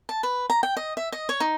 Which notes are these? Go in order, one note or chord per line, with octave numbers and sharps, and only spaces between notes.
A5
B4
A#5
G5
D#5
E5
D#5
C#5
D#4